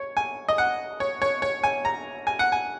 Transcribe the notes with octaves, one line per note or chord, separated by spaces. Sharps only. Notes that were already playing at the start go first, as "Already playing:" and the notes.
Already playing: C#5
G#5
D#5
F#5
C#5
C#5
C#5
G#5
A#5
G#5
F#5
G#5